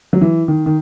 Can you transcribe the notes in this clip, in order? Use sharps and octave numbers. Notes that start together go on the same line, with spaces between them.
F#3
E3
D#3
D#3